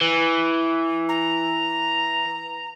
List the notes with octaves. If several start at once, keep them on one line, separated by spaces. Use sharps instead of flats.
E3
A#5